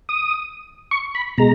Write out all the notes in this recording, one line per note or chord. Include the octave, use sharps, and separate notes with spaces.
D#6
C#6
B5
B2 G#3 A#5